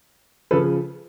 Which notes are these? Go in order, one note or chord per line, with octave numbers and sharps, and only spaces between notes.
C#3 F3 A4 B4